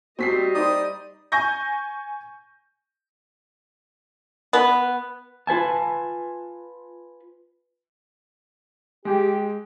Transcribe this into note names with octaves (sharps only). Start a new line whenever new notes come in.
G3 C4 F#4 D#5 B6 C7
D#4 G4 C5 D5 D#6
G#5 C#6 G6 A#6
B3
F4 B4 G#5 A5
G#3 G4